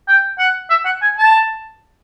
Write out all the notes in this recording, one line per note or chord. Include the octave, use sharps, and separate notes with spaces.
G5
F#5
E5
F#5
G#5
A5